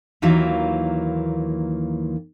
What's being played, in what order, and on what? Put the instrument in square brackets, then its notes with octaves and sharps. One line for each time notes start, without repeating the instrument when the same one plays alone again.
[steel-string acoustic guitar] D#2 D#3 E3 F#3 A#3 F4